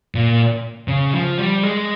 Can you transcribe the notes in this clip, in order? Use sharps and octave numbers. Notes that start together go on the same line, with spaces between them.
A#2
C#3
F3
G3
G#3